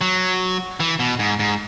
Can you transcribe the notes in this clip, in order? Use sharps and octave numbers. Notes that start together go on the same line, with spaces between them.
F#3
E3
B2
G#2
G#2